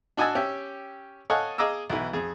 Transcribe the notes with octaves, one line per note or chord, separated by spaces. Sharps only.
D4 F#4 D#5 G#5 A5 E6
C#4 G4 E5
A4 C#5 D#5 F5 F#5 G#5
G#4 D#5 F5 A#5 D6 E6
B1 E3
F2 G#4